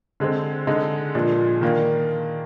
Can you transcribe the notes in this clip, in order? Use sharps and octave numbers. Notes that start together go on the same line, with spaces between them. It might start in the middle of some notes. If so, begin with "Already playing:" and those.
D3 G#3 C4
D3 G#3 D#4
A#2 F3 G#3 D4
D#3 A#3 D4